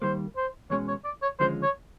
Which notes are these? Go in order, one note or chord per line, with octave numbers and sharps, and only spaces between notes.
D#3 G3 A#3 C5
C5
E2 B2 G#3 C#4 C#5
C#5
D5
C#5
D#2 D3 F3 G#3 C#4 C5
C#5